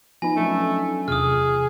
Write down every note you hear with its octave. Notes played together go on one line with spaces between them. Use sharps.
F3 B3 D#4 G#5 B5 A#6
F#3 A3 C#4 D4
E2 C3 F4 G#4 D#6 F6